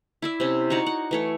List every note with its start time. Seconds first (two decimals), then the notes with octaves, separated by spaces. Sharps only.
0.22 E4 D5 E5
0.40 C3 C#4
0.70 D#4 F#4 C#5 D5
0.87 F#5
1.11 E3 A3 C#5